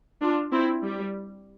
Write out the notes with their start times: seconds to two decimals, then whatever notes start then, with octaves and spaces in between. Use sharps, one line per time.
0.21 D4 F4
0.52 C4 E4
0.83 G3